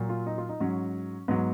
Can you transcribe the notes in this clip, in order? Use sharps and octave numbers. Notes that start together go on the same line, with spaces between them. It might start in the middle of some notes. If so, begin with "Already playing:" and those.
Already playing: A#2 F#3
F4
D#4
F4
D#4
G#2 F#3 C#4
G#2 F#3 B3